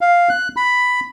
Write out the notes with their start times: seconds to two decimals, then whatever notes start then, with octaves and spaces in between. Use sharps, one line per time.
0.01 F5
0.29 F#6
0.56 B5